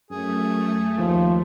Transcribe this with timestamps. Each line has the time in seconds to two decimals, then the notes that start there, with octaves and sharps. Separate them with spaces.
0.11 F#2 A3 G#4
0.98 D#2 F3